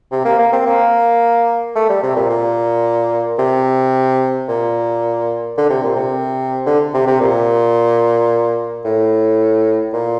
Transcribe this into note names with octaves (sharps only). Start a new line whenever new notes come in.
C3
A#3
A#3
C4
A#3
A3
G3
C3
A#2
A#2
C3
A#2
D3
C3
A#2
C3
D3
C3
C3
A#2
A2
A#2